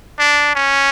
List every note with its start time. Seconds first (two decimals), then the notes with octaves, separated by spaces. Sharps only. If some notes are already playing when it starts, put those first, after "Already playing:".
0.19 D4
0.55 C#4